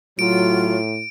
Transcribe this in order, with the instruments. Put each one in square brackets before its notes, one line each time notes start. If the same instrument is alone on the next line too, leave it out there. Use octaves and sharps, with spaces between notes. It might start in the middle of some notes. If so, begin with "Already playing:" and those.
[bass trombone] A2 [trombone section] F#3 [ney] F4 [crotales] D7